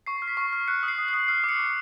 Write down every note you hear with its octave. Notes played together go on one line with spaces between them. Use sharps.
C#6 C7
F6
B6
C#6
F6
F#6 C#7
D#6
C7
D#6
C7
D#6
F6 C7
D6
C#7
D6